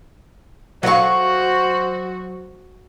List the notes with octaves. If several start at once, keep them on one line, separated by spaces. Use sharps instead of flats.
F#3 F#4 C5 D#5 F5 F#5 C#6